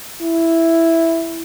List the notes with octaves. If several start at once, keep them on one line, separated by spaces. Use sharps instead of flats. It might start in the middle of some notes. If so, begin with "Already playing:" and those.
E4